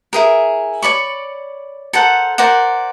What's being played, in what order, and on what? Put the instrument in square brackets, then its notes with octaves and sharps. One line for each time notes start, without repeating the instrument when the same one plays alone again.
[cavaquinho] E4 G#4 A#4
C#5 D5 B5 C#6
A4 A#4 C5 F#5
A#4 C5 D5 F#5